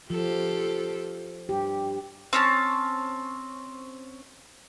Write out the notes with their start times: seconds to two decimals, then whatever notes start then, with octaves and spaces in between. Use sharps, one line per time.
0.10 F3 F4 G4 A4
1.49 G2 G4
2.33 C4 C#4 A5